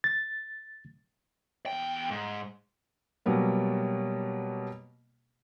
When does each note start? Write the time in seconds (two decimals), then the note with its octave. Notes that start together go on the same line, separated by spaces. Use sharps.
0.04 A6
1.66 E2 G5
2.11 G#2
3.26 B2 F#3 G3 A#3